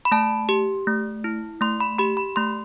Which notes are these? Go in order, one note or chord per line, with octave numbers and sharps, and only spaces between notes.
B5
A3 A5
G4
A3
E4
A3 C6
B5
G4 B5
B5
A3 C6